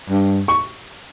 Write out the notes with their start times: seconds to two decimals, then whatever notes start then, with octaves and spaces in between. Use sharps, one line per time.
0.10 G2
0.48 C#6